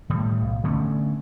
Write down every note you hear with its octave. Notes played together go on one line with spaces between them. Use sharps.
A2 D#3 G3
B1
D3 A3 B3 C#4